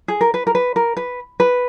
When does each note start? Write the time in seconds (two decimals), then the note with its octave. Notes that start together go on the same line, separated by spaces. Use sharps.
0.08 G#4
0.21 A#4
0.34 B4
0.47 A#4
0.55 B4
0.76 A#4
0.97 B4
1.40 B4